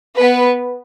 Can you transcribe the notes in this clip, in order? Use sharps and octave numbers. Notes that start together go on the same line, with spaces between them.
B3 B4